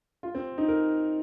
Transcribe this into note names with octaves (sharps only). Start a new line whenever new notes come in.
F4
C4
D#4
A#4